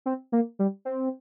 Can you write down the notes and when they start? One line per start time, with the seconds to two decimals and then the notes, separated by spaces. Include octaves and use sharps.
0.06 C4
0.32 A#3
0.59 G3
0.85 C4